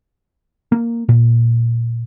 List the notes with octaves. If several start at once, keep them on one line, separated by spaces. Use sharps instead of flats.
A#3
A#2